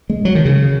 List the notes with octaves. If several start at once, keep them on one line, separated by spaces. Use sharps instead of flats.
G#3
F#3
D#3
C#3